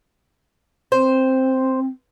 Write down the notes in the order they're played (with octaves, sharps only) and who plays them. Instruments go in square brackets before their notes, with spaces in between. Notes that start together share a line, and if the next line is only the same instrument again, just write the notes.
[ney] C4 [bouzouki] C5